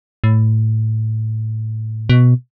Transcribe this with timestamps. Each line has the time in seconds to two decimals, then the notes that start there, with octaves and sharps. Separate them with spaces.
0.24 A2
2.09 B2